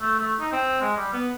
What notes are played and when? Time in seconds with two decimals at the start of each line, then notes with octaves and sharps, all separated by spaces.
0.01 A3
0.19 A3
0.40 D#4
0.52 C4
0.81 G#3
0.97 G3
1.13 B3